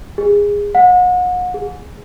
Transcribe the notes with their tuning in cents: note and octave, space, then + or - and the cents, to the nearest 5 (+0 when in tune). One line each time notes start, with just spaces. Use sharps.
G#4 -20
F#5 -35
G#4 -5